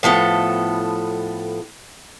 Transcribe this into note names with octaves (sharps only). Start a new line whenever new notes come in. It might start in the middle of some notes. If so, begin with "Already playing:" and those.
A2 F3 B3 A4